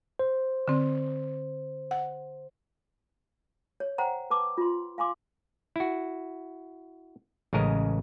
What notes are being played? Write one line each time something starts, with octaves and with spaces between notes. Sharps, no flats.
C5
D3 C4
F#5
C#5
C5 F#5 G5 A#5
B4 A5 D6
F4 C6
F5 G#5 C6 D6
E4 F#4
A1 C#3 G#3 A#4 D#5